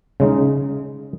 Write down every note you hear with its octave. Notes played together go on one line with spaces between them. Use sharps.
C#3 G#3 D#4